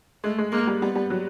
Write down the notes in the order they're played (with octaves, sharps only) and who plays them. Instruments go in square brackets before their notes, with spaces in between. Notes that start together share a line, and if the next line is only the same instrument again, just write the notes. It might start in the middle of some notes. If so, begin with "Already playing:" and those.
[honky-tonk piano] G#3 [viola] A3
[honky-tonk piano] G#3
[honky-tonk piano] G#3 [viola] A#3
[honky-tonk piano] G3
[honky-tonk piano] G3 [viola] B3
[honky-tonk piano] G3
F#3